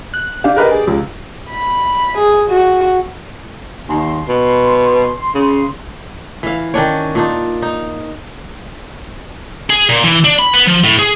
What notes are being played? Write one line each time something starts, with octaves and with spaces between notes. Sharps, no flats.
F#6
D4 G4 F5
A#4 B4 D#5
G#4
C#2
B5
G#4
F#4
D#2 C6
B2
C#3
E3 F5
D#3 C#4 D4 C#5
A#2 D4 D#4
D#4
G#4
A#2
E3
D4
B5
B3
F3
A2
G#4